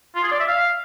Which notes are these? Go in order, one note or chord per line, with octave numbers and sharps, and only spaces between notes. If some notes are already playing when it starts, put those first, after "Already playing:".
F4
G#4
D5
E5
F5